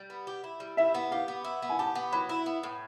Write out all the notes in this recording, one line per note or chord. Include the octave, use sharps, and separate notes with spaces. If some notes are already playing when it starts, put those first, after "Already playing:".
Already playing: G3
B3
G4
E4
G3
E4 E5
B3
G4 F5
B3
E4
B3
G#5
G4 A5
B3
F#3 B5
E4
B3
A2